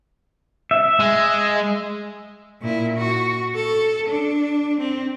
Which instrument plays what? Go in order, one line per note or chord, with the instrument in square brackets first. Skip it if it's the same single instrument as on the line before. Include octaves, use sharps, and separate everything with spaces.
[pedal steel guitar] E5
[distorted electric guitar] G#3
[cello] A#2 E4
F#4
A4
D4
C4